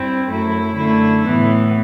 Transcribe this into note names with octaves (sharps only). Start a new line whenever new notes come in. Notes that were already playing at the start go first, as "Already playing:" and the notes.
Already playing: G2 C4 E4
F#2 F#3 A3 E4
F#2 D3 A3 E4
A2 E3 B3